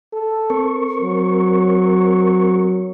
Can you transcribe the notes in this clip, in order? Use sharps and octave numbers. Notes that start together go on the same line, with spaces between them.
A4
C4 A#4 C#6
F#3